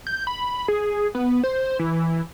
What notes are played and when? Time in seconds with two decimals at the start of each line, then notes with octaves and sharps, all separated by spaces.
0.07 G6
0.27 B5
0.68 G#4
1.15 B3
1.44 C5
1.79 E3